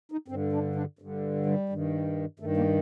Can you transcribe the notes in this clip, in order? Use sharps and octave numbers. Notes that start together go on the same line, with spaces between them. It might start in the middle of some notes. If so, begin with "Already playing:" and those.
D#4
G2 D3 C4
D4
D4
G2 D3
G3
G2 D#3
G2 D#3 A3
A#3